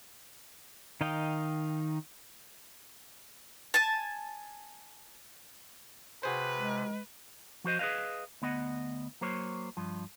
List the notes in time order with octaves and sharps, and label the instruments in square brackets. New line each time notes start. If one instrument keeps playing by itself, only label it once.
[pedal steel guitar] D#3 D#4 D#5 F5 G5
[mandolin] G#5 A5
[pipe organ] C3 [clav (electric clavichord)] F#4 G#4 C5 [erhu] B4
[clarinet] G#3
[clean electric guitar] F3 F#4 C5 D#5
G#4 B4 C5 D#5 F5
D2 B3 D#5 F#5
F#3 A#3 C5 C#5
G2 F3